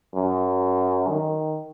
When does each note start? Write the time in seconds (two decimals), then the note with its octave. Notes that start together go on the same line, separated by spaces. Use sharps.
0.15 F#2
1.08 D#3